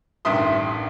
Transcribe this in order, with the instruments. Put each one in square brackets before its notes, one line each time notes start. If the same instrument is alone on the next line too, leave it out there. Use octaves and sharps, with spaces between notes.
[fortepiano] A1 G2 D#3 E5 C6 D#6